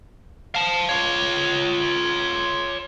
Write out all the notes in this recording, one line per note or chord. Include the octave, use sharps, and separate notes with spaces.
F5 A5
F4 C#5